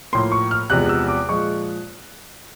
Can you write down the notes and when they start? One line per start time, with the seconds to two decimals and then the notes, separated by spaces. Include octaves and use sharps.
0.13 A2 F3 A#3 C6
0.32 C#6
0.51 F6
0.70 E2 C3 F3 G#3 B3 F#6
0.89 E6
1.08 D6
1.28 A#2 F3 G#3 C#6